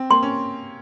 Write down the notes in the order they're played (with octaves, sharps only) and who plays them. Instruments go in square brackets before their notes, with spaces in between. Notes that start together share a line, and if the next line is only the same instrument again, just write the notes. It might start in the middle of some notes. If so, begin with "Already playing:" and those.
Already playing: [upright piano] C4
[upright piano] A#3 [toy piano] C6
[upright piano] C#4